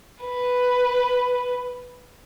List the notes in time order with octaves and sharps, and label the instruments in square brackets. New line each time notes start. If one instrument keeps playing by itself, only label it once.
[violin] B4